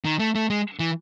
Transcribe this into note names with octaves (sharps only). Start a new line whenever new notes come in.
D#3
A3
A3
G#3
E3